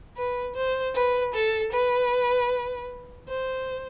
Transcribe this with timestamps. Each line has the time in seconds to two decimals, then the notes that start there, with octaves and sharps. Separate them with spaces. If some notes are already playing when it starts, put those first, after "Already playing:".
0.17 B4
0.55 C5
0.95 B4
1.34 A4
1.72 B4
3.29 C5